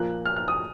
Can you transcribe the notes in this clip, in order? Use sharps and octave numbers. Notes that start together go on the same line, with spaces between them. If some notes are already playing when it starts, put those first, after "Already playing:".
Already playing: A#2 F3 A#3 F#6
F6
F6
D#6